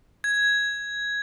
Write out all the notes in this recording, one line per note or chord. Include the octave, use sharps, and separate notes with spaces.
G#6